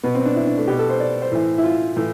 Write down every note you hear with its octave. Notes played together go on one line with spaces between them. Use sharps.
B2 B3
C4
D4
E4
D4
A3
B2 G4
A4
C5
D5
C5
A2 E3
E4
F4
A2 E3